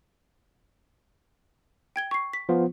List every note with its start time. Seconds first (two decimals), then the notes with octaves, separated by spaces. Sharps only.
1.96 G5 G#6 G7
2.11 C#6 C7
2.33 B6
2.49 F3 B3 F4